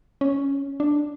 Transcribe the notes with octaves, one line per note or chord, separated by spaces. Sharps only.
C#4
D4